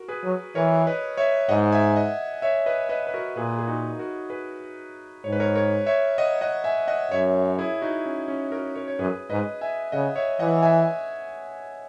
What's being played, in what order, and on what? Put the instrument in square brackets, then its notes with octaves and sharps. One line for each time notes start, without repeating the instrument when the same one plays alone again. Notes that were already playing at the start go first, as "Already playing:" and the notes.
Already playing: [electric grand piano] F#4 A#4
G#4 B4
[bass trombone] F#3
[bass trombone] E3 [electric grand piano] A#4 C#5
[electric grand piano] B4 D#5
C#5 E5
[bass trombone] G#2 [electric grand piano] D#5 F#5
[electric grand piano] E5 G#5
D#5 F#5
C#5 E5
B4 D#5
B4 D#5
B4
F#4 A#4
[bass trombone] A#2 [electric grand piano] G#4 B4
[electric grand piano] G#4
D#4 F#4
F#4 A#4
G#4 B4
[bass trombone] G#2 [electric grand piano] C#5
[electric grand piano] B4
A#4 C#5
A#4 C#5
C#5 E5
D#5 F#5
D#5 F#5
E5 G#5
D#5 F#5
[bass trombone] F#2 [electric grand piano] C#5 E5
[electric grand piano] E4 G#4
D#4 F#4
C#4
C#4
F#4 A#4
A#4 C#5
C#5
[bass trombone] F#2 [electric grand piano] G#4 B4
[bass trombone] G#2 [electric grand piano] B4 D#5
[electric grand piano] E5 G#5
[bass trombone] C#3 [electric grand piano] D#5 F#5
[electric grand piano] C#5 E5
[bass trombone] E3 [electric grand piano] D#5 F#5
[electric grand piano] E5 G#5